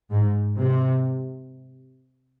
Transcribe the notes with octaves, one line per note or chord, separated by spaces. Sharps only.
G#2
C3